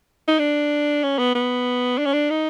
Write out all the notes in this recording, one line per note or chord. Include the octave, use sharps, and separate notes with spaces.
D#4
D4
C#4
B3
B3
D4
C#4
D4
D#4